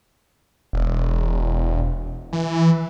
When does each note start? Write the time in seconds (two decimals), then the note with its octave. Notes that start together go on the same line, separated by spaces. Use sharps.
0.73 E1
2.33 E3